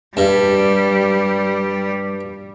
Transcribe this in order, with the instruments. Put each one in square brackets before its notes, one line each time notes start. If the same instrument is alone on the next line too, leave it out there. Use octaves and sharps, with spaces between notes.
[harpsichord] G2 [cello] G3